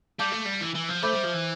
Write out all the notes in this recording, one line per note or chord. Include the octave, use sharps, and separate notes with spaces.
G3 F5 A5 D6 G6
A3
G3
E3
E3
F3
A3 C5 E5 B5 D6 G6
G3
F3
E3